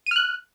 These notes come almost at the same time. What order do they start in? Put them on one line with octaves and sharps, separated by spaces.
D#7 F6 F#6